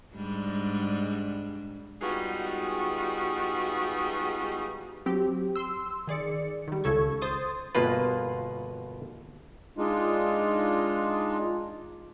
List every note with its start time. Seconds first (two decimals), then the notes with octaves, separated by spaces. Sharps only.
0.13 G#2 G3 D4
2.02 G3 G#3 B3 D#4 F4 F#4
5.06 F#3 C4 G4
5.56 C6 E6
6.07 D#3 G#4 D5 C#7
6.68 D#3 G3
6.84 C#2 C#3 A4 C#6 G#6
7.21 C5 C6 D#6 A6
7.75 G1 B2 A#3 F4 B4
9.78 G#3 D4 D#4 F4